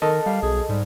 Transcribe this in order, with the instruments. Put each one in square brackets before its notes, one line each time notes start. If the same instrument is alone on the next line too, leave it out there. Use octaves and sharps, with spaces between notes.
[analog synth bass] D#3 [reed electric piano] A4 D#5 A5 [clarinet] A#4
[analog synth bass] G3 [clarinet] F5
[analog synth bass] B1 [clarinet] G#4
[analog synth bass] G#2 [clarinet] G3